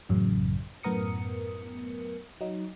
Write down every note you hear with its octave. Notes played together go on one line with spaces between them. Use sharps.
A1 F#2 C#3
F#2 A2 B3 A#4 D#6 C#7
F#3 D#4